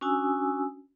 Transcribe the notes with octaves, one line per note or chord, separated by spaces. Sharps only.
C#4 D4 F#4 G#5 D#6 E6